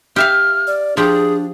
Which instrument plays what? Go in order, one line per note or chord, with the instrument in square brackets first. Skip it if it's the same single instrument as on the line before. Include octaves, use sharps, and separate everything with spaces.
[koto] G4 E5 F5 [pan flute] F6
[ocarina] D5
[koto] F3 G4 [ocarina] D4 [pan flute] G#4